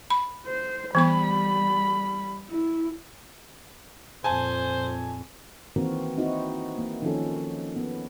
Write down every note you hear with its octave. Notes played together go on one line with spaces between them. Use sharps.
B5
C5
E3 G3 B3 B5 C#6
E4
F2 A#2 C5 G#5 A5
D#3 E3 A#3 C4 F#4 A#4
C4 D#4 E4 F#4
A#3
D#3 F3 C#4 A4
B3